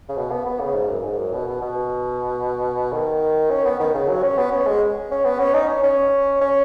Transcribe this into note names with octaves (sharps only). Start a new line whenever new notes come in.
C#3
B2
B3
B3
C#3
G#2
F#2
G#2
F#2
B2
B2
B2
D#3
C#4
B3
D#3
C#3
F#3
C#4
B3
C#4
G#3
C#4
B3
C#4
D#4
C#4
C#4
C#4